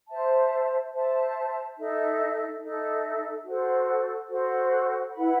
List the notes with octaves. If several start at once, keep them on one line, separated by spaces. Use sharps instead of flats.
C5 E5 A5
C5 E5 A5
D#4 A4 E5
D#4 A4 E5
F#4 A4 C5
F#4 A4 C5
E4 B4 F#5 B5